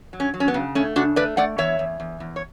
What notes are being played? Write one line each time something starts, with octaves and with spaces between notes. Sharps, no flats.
F#3
C#4
F#3
C#4
B3
C#3
A3 C#4
C#3 D4 F#4
A3 B4 D5
A3 D5 F#5
E2 C#5 E5
E2
E2
E2
C#5